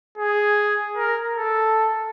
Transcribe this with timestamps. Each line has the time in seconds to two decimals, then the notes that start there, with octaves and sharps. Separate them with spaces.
0.18 G#4
0.96 A#4
1.35 A4